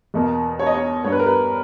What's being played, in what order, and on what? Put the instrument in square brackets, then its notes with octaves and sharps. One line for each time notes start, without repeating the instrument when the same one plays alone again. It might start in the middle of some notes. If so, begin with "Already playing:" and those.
[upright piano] E2 B2 A#3
C#5
D#5
C#5
G2 G3 B3 C#5
B4
A#4
B4